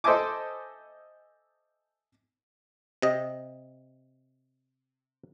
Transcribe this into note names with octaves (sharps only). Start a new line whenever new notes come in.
A4 C5 D#5 E5 G#5 D6
C3 D#5